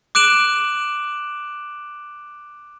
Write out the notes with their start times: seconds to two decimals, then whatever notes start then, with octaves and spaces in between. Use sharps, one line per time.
0.15 D6 F#6 D7 E7 F#7